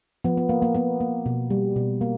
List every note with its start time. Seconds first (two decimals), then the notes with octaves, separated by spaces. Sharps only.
0.24 F3 B3
0.37 B3
0.49 A#3
0.62 A#3
0.75 A#3 B3
1.00 A#3
1.26 B2
1.50 G3
1.76 B2
2.01 A#3